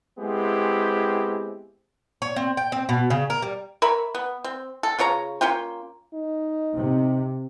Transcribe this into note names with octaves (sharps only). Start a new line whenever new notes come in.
G#3 B3 C4 E4 G4
C#5
C4
G5
C4
B2
C#3
A#4
G3
A#4 C#5 E5 B5
B3
C4
A4
C#3 F4 C#5 A#5
A#3 C#4 F4 G5
D#4
C3